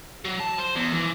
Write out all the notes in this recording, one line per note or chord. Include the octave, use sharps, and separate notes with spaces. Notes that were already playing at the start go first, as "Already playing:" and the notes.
F#3
A5
C5
E2
E3